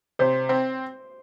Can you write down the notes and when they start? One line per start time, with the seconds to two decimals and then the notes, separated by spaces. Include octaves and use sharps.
0.19 C3 C5
0.49 C4